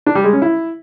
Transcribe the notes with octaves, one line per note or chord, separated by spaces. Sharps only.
D4
G3
G#3
C#4
E4